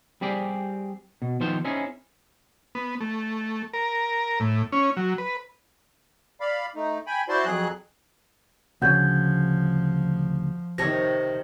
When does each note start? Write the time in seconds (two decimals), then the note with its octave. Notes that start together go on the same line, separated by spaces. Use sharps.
0.21 G3 C4 G4 G#4 D5
1.22 B2
1.40 D#3 F3 B3 A4 C5
1.64 C4 C#4 D#4 E4 G#4
2.75 B3
3.01 A3
3.73 A#4
4.40 A2
4.72 C#4
4.97 F#3
5.18 B4
6.41 D5 F5 B5
6.75 A3 D#4
7.07 G5 G#5 B5
7.28 E4 F#4 C5 D5 A5 C6
7.45 F2 F#3 G#4 F#6
8.82 D2 A#2 C#3 F3 F#5 G6 G#6
10.78 C3 D#3 C#5 A5 A#6